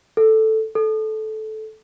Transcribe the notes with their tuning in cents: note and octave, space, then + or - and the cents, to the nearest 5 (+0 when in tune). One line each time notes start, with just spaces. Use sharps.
A4 +0
A4 -15